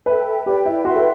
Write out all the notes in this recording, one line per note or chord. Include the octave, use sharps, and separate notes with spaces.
A4 B4 E5 G5
G4 B4 D5 G5
E4
F#4 B4 E5 G5 C6
A4